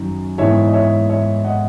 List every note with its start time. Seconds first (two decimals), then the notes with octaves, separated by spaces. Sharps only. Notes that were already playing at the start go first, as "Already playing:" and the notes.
Already playing: F#2 D#3 F#3
0.38 G#2 E3 B3 C#5 E5
0.67 D#5
0.73 C#5 E5
1.09 C#5 E5
1.44 D#5 F#5